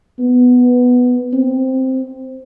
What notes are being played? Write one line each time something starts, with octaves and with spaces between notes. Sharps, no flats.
B3
C4